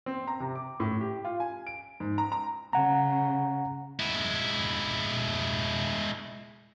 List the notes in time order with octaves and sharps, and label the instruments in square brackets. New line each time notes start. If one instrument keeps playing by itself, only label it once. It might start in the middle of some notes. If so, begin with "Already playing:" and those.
[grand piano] C4
A#5
C3
D6
A2
G4
F4
G#5
D7
G#2
A#5
A#5
[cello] C#3 [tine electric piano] F#5 A#5
[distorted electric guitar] G#3 E4